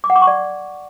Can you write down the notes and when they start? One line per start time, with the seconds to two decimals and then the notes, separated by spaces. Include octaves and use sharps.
0.04 D6
0.10 F#5
0.16 D6
0.21 C#6
0.27 D5